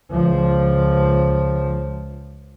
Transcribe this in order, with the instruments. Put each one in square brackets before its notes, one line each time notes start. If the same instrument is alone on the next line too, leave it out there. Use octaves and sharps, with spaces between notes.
[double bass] C#2 F3